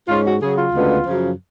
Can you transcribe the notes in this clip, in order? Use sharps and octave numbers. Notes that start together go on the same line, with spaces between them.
G#2 G#3 C#4 F4
F#4
C#3 F#3 C#4 G#4
F4
D2 C#3 G#3 B3 D4
F#2 C#3 F3